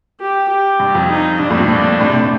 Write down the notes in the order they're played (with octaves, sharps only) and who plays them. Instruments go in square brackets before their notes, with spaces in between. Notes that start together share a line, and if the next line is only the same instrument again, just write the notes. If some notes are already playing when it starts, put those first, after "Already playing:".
[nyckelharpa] G4
G4
[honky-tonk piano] G2
F2
[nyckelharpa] D#4
[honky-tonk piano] G2 [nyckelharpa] D4
[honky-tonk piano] F2 A2
G2 A#2
[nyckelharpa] D4
[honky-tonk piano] A2 C3
A2 C3
A2 C3